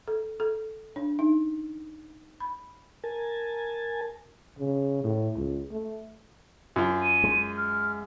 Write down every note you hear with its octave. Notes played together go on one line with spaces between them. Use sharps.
A4
A4
D4
D#4
B5
A#4 G#5 A5
C#3
A2
C#2
A3
F#2 F4
D#7
G#3
F6